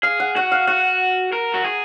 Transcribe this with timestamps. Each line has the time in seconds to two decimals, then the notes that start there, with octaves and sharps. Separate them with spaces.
0.03 G#4 F5
0.20 F#5
0.36 F#4 F#5
0.52 F5
0.67 F#4 F#5
1.33 A#4
1.54 F#4
1.64 G#4